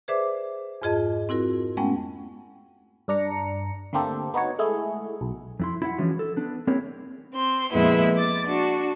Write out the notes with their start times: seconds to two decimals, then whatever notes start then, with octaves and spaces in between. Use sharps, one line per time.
0.08 G#4 B4 C5 D5 E5 D6
0.82 F2 G#2 F4 G#4 D#5 A5
1.29 C4 E4 F#4 A#4
1.77 G#3 A3 B3 C#4 F#5 G5
3.08 G2 D4 A#5 C#7
3.93 D3 A3 A#3 C4 G4 A4
4.34 B3 D#4 F#4 C#5
4.59 G#3 A3 E4 G#4
5.21 B1
5.60 F2 E4 C6
5.82 E4 E5 F#5
5.98 E3 F3 G#3 C#4 D4 F#4
6.19 A4
6.36 B3 D4
6.67 A#3 C4 E4 G#4 A#4 C#5
7.34 C4 C6
7.73 F2 A#2 G#3 B3 E4
8.16 D6 A6
8.46 D4 F#4